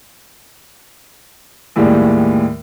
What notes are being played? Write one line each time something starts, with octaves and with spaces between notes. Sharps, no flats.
D#2 A2 G3 G#3